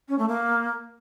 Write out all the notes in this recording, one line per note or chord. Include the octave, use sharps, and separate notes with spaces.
C#4
A3
A#3